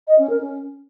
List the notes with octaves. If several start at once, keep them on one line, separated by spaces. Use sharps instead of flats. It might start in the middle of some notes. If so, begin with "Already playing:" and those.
D#5
C#4
A#4
C#4